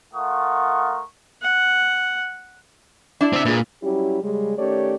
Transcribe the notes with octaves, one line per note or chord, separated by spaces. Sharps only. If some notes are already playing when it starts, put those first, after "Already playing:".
A3 F4 A#4 F#5 C#6 D#6
F#5
D4 E4 D5
C4 E5
A#2 G#4 B4
F#3 G3 C#4 E4 G4
C#3 G3 G#3
D#3 A3 C#4 G4 C#5 D5